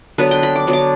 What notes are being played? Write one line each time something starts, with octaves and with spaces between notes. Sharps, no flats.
D3 F#3 B3 B4
G5
B5
D6
D3 F#3 B3
D6